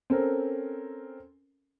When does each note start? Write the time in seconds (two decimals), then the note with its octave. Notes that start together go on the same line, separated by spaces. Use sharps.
0.10 C4 C#4 A4 A#4